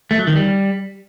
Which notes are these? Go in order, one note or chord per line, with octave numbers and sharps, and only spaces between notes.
A3
F#3
D#3
G3